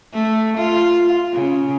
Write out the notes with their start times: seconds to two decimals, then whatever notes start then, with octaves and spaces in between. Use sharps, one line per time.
0.14 A3
0.57 F4
1.32 C#3